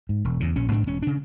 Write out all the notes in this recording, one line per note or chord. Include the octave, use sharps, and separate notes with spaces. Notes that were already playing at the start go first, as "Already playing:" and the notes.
G#2
E1
E2 C#3
A#1 C#4
G#2 D4
E1 C#4
C#3 D4